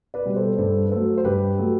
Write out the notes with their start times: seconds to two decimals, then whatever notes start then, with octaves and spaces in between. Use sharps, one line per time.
0.14 B4 D5
0.25 B2 G3
0.36 A4 C5
0.58 G2 A4 C5
0.85 B4
0.91 F#3 A3 A4 C5
1.18 C5
1.25 G2 G4 B4
1.58 F#3 A3